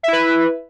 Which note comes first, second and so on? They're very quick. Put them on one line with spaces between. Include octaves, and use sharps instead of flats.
E5 E4 B4